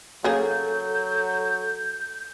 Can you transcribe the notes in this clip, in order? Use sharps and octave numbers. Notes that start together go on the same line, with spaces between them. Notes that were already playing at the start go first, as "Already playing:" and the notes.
C#3 F#3 A#3 G#4 A4 G6